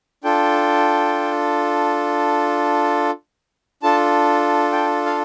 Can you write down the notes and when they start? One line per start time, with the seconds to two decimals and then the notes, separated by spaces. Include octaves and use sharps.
0.24 D4 F4 A4 G5
3.83 D4 F4 A4 A5
4.72 G5
5.06 F5